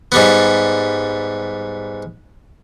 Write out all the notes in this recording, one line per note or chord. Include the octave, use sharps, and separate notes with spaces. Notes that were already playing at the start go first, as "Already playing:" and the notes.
G#2 G3 B3